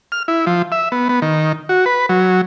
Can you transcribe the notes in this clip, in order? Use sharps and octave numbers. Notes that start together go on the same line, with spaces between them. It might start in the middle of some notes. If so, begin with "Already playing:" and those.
F6
E4
F3
E5
B3
B3
D#3
F#4
B4
F#3